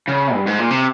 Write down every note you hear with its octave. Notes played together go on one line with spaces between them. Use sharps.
C#3
G2
G#2
A#2
C3